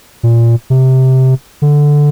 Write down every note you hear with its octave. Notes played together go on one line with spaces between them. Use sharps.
A#2
C3
D3